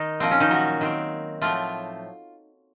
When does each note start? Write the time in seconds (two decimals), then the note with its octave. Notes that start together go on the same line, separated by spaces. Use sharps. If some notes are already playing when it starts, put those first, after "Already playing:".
Already playing: D#3 D#4
0.20 A#2 F3 A#3 C4
0.31 C#4
0.40 D#3 D#4
0.50 F#3 F#4
0.81 D#3 F#3 C4
1.41 A2 F3 F#3 A3 C4 F4